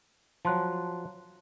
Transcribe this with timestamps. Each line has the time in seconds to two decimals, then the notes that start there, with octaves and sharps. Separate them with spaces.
0.45 F3 F#3 A5 C6 F#6